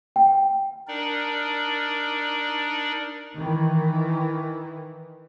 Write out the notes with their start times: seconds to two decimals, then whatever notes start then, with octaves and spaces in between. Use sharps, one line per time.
0.16 G5
0.88 D4 D#4 A#4 D5
3.36 D#3 E3